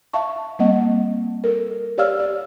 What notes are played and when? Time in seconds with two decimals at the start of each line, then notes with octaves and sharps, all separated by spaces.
0.13 E5 F5 A5 C#6
0.59 G3 A#3 C4 D#5 F#5
1.44 A4 A#4
1.98 G4 C#5 D5 F5 E6 F6
2.19 D5